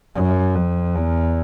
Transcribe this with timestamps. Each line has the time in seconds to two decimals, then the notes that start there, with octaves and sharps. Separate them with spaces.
0.16 F#2
0.55 F2
0.96 E2